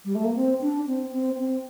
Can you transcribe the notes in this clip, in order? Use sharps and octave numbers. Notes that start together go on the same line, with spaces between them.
G3
A3
A#3
C4
D4
C4
C4
C4